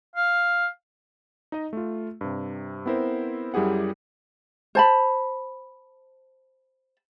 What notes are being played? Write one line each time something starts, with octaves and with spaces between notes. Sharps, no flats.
F5
D#4 D#5
A3 F4
G2 C3
B3 C4 E4 A#4 C5
F#2 G3 E4 G4 G#4 F#5
C5 A5 B5